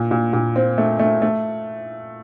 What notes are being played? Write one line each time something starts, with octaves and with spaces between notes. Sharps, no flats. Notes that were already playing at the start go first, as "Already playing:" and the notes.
Already playing: A#2
A#2
A#2
C4
A3
A3
A3